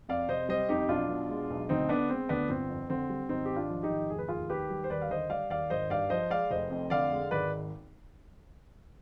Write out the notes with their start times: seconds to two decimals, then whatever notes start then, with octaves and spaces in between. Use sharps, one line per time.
0.09 F2 D5 F5
0.29 C3 C5 D#5
0.49 G3 C5 D#5
0.69 F2 D#4 G4
0.89 B1 D4 F4
1.09 B2
1.29 G#3
1.50 B1
1.69 D2 C4 D#4
1.89 D3 B3 D4
2.10 G#3 C4
2.29 D2 B3 D4
2.49 G1 C4
2.69 F2
2.90 D3 C4
3.09 G3
3.29 G#1 C4 D#4
3.45 G#2 G4
3.56 D4 F4
3.70 F3
3.83 D#4 G4
3.90 G#1
4.10 F1 G#4
4.18 B4
4.28 D#2 F4 G#4
4.50 D#3 G4 B4
4.70 G3
4.84 C5
4.90 D#2 B4 D5
5.02 F5
5.10 D3 C5 D#5
5.30 G3 D5 F5
5.50 D#2 D5 F5
5.70 G#1 C5 D#5
5.90 G2 D5 F5
6.10 F3 C5 D#5
6.30 G#3 D5 F5
6.51 F1 C5 D#5
6.70 F2
6.90 D3 D5 F5
7.11 G#3
7.31 G#1 B4 D5